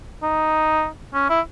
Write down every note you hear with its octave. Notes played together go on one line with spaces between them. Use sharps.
D#4
C#4
E4